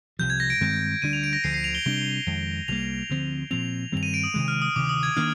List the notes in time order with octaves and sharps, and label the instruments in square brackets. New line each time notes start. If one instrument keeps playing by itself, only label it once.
[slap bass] C2 C3 F3 [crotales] G6
[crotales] G#6
A#6
D7
[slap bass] G2 D#3 G#3 C4
[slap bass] D2 D3 G3 D4 [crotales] D#7
[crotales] F7
D7
A#6
[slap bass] D2 D3 F3 [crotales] C7
[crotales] C7
F7
G7
[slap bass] C3 G3 D4 [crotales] G7
[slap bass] F2 D#3 G#3
[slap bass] C2 C3 G3 A#3 [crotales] F7
[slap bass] D2 D3 F3 C4
[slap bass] A#2 F3 C4 [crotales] F7
[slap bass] G2 D#3 G3 C4 [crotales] F7
[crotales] D#7
D7
D#6
[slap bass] C3 D#3 G#3
[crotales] F6
D#6
[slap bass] D2 C3 D#3 [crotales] D6
[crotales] D#6
G#6
[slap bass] D#3 A#3 D4 [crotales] F6